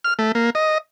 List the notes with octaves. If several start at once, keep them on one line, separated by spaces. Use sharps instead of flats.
F6
A3
A#3
D#5